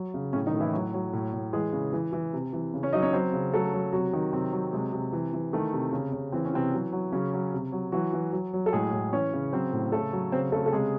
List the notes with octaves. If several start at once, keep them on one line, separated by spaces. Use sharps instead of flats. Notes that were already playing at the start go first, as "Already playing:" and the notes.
Already playing: F#3
C#3
A2 C#3 C#4
D#3 D#4
A2
E3 E4
F#3 F#4
F#3
A2
A2
E3 G#3 G#4
C#3
E3
E3
C3
E3
C#3
C#4 C#5
F#3 D#4 D#5
C#4 C#5
F#3 C4 C5
C#3
F#3 A3 A4
F#3
C3 F#3 F#4
D#3
C3 F#3 C4
F#3
C3 G#3
C3
E3
E3
D#3 A3
C3
C#3
C#3
E3 C4
C#4
C3 E3 C4
F#3
F#3
C#3 F#3 C#4
F#3
C3
F#3
E3 F#3 F#4
E3
F#3
F#3
A4
A2 G#3 G#4
A2
E3 C#4 C#5
C#3
F#3 C4 C5
A2
C#3 A3 A4
F#3
C#3 C4 C5
C#3 A3 A4
A4
C3 G#3 G#4